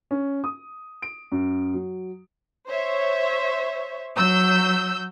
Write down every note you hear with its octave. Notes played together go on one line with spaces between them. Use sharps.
C#4
D#6
D7
F#2
F#3
C5 C#5 E5
F#3 E6 G6